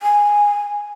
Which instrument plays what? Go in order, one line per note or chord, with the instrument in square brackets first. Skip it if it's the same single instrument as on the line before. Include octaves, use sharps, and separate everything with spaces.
[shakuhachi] G#5